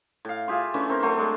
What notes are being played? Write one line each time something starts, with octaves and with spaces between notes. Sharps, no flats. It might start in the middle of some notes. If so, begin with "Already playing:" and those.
A2 F5
F4 G4 G#4 E5
E3 A3 C#4 D4
C4 A#4 C5 C#5
F#3 A3 C5
G#3 A3 D4